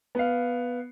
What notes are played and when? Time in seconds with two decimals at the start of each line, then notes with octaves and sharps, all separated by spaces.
0.15 B3 F5